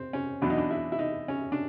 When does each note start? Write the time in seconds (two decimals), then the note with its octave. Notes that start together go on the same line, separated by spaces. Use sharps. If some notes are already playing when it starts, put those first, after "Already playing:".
Already playing: C4
0.13 C#4
0.42 E2 B2 F#3 D4
0.50 D#4
0.58 D4
0.71 E4
0.92 E4
0.99 D#4
1.28 C#4
1.52 D4